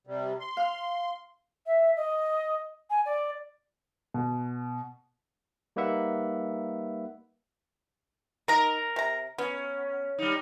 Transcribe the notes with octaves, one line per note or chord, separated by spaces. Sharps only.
C3 G3
C6
F5 F6
E5
D#5
G#5
D5
B2
G3 A#3 D#4 B4 E5 F#5
D#4 A#4 A#5
C3 A#5
B3 C#4
G3 D#4